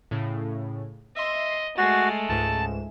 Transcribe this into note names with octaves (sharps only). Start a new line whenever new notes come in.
A2 C#3
D#5 E5 C6
G#3 A3 F#4 A6 C7
C#2 G#2 A5 E7